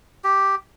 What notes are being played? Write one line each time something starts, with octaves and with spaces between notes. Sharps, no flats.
G4